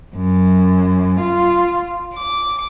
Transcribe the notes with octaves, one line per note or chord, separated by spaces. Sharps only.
F#2
F4
D6